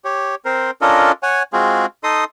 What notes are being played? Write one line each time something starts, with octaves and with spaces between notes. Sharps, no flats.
G4 C#5
C4 A#4 C5
C#4 D4 F4 A4 A#4 D#5
C#5 F#5 G#5
G#3 C4 F4 F#4 G#4
D#4 A4 D#5 C6 D#6